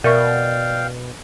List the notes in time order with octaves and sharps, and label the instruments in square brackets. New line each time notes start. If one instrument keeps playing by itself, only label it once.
[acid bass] B2 [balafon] A#4 E5 C#6 [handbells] D5 [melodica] F5 G5